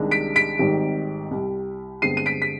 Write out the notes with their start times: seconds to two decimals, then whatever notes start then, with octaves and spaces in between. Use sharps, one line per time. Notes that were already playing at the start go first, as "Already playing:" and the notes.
Already playing: C2 C3 D#3 G#3 D4
0.11 B6 D7
0.36 B6 D7
0.59 G#1 G#2 D#3 G3 C4
1.31 C2 C3 G3
2.02 G1 G2 D3 G#3 C4 C7 D#7
2.17 D#7
2.26 B6 D7
2.42 B6